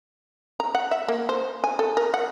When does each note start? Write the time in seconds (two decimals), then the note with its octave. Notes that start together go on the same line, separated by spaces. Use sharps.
0.60 A#5
0.75 F#5
0.91 E5
1.08 A#3
1.29 C5
1.64 G#5
1.79 A4
1.97 A#4
2.14 F#5